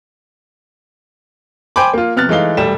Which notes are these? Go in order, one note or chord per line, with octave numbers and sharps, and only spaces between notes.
C5 G5 G#5 B5 D6
A#3 F4
C3 B3 F6 F#6 A6
E3 G#3 A3 D#4 F5 G7
E1 G3 A3 E7